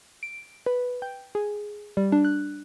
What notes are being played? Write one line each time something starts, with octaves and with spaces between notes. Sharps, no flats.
D7
B4
G5
G#4
G3
D4
F#6